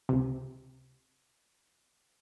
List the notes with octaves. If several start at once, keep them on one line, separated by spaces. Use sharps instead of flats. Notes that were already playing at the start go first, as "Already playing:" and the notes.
C#2 C3